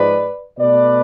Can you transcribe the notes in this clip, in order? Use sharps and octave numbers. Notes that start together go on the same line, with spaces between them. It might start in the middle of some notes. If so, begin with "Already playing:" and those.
Already playing: G#2 F3 G#3 B4 D5
B2 A3 B4 D5